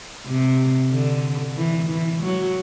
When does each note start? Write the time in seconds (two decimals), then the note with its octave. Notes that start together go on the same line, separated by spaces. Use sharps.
0.26 C3
0.91 D3
1.57 E3
1.90 E3
2.23 F#3